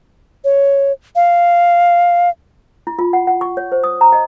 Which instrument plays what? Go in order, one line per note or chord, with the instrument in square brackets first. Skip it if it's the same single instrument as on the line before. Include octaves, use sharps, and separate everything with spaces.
[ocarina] C#5
F5
[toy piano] E4
F4
F#5
F#5
C#6
C#5
C5
D#6
A#5
D#5